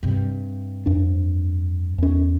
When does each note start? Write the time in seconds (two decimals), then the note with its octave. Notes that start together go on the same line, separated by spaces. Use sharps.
0.03 G2 C3
0.86 F2 D4
1.98 E2 C#4